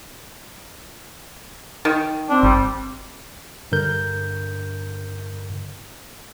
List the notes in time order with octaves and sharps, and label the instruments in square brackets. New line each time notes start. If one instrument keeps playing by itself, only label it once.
[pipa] D#3
[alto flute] C4 [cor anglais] D4
[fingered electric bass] G1 [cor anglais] G3
[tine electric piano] G2 D3 A#4 G6